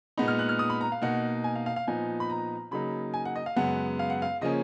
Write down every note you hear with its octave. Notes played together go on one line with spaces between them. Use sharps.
A#2 G#3 B3 D#4 B5
F6
F#6
F6
D#6
B5
A#5
F5
B2 A#3 D#4 F#5
G#5
F5
F5
F5
A#2 F3 B3 D#4 G#5
B5
A#5
C#3 F#3 A#3 D#4 B5
G#5
F#5
D#5
F5
F#2 C#3 G#3 B3 F#5
F5
F#5
F5
C#3 F3 A#3 C#4 D#5